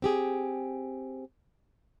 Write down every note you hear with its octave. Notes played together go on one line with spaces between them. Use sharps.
C4 G4 G#4